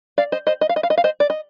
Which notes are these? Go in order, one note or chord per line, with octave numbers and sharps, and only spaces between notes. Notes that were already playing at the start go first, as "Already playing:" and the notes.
D5 F5
C5 D#5
C5 D#5
D#5
F5
D#5
F5
D#5
F5
C5 D#5
D5
D#5